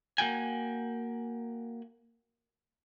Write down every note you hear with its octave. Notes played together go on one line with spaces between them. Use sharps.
A#3 F#4 G5 G#5